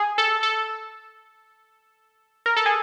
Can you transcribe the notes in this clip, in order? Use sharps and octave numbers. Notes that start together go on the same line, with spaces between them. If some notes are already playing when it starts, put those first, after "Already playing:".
Already playing: G#4
A4
A4
A#4
A4
G#4